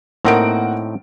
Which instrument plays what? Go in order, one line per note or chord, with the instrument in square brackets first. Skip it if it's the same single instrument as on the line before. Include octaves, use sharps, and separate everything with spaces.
[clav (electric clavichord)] A2 C4 D#4 [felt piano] A#3 F#5 D7